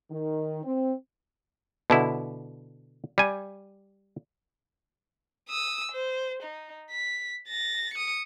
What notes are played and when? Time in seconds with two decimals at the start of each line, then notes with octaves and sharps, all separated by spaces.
0.11 D#3
0.64 C4
1.90 B2 D3 E4
3.18 G3 G#5
5.49 D#6 E6
5.92 C5
6.43 D#4
6.91 B6
7.48 A6 A#6
7.94 D#6 C#7